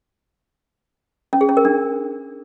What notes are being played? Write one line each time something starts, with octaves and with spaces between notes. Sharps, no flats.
C#4
G#4
C#4
A#4
D4